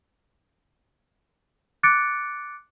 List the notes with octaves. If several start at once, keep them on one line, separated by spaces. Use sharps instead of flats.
D6 F#6 A6 C#7 D7